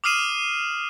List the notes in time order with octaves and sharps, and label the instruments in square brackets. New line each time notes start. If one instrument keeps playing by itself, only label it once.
[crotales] D6 D#6 F6 C7 D#7 E7